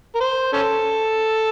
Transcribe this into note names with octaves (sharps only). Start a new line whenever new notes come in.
A#4
C5
C#4 A4